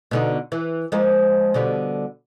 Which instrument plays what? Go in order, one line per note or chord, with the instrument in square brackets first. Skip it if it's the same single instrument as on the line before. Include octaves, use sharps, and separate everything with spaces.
[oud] B2 D3 D#4
E3
F3 G#3 A#3
B2 D3 G3